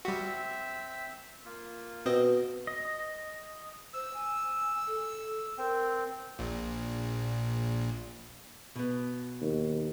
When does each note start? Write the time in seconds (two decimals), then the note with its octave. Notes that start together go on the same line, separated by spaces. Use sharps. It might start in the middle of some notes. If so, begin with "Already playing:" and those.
0.05 G3 C4 F#4 E5 E6
1.45 A#3 F4
2.06 B2 C4 D#5
2.67 D#5
3.94 C5 E6
4.14 G#5
4.87 A4
5.58 C4 A#4
6.39 A#1 A#2
8.76 B2 B3
9.41 D#2